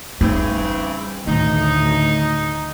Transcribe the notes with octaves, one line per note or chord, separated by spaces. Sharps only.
C#3 E3 G3 C4 D#4
D2 A2 D#3 D#4